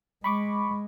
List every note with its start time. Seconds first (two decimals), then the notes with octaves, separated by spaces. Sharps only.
0.24 G#3 B5 C#6 D6